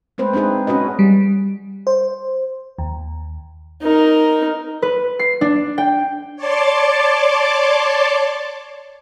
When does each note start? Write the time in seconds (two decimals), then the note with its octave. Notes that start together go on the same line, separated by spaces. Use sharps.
0.18 G#3 A3 C4 B4 C5
0.33 C4 D4 D#4 G#4 B4
0.67 C#4 F#4 B4 D#5
0.99 G3
1.87 C5
2.78 D#2
3.82 D#4 A#4
4.82 B4
5.19 C7
5.41 D4
5.78 G5
6.36 C#5 D5 A5 C6 D6